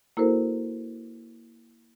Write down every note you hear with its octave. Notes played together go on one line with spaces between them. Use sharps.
A#3 E4 F#4 A4 A#4 C5